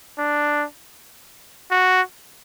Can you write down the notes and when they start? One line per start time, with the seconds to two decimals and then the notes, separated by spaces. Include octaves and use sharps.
0.19 D4
1.71 F#4